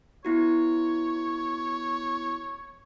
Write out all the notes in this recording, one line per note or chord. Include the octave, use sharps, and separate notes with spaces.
B3 E4 F#4 C#5